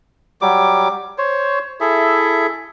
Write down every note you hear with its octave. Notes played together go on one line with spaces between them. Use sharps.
F#3 G3 D6
C5 C#5
E4 G#4 A4 E5